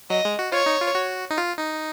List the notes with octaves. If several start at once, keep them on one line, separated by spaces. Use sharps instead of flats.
F#3 D#5
G#3
F#4
F4 C#5
D#4
F4
F#4
D#4
F4
D#4